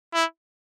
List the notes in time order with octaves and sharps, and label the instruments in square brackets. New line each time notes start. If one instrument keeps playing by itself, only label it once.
[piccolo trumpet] E4